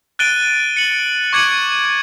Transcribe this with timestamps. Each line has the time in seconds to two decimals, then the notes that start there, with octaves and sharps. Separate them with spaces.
0.19 F#6 A6 D7 D#7 G7
0.77 C#7 F#7
1.33 C#6 D6 G#6 C#7 D#7 F#7